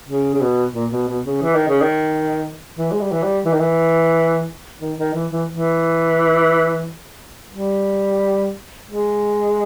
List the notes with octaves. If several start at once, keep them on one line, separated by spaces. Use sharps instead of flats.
C#3
C#3
B2
A#2
B2
B2
C#3
E3
D#3
C#3
D#3
E3
G#3
G3
E3
G3
E3
D#3
E3
D#3
D#3
E3
E3
E3
G3
G#3